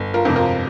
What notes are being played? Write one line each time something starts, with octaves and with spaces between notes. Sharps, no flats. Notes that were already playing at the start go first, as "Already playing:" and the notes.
Already playing: G1
F4 A#4
F2 C3
F4 A#4